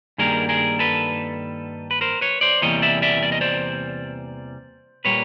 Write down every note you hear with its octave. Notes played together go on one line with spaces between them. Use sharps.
G2 D#3 G3 A#3 G#4 A#4
G#4 A#4
A4 B4
B4
A#4 C5
B4 C#5
C5 D5
E2 C3 E3 G3 A#3 C#5 D#5
D5 E5
D5 E5
D5
D#5
C5 D5
A#2 G3 A#3 B4 C#5